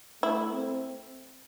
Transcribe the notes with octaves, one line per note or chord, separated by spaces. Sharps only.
A3 E4
C4